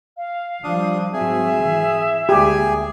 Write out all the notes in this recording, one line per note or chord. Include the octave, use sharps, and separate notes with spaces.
F5
F3 G3 D4 D#6
G#2 F#3 C4 G#4 E5
E3
D2 G#3 A#3 G4 G#4 G#5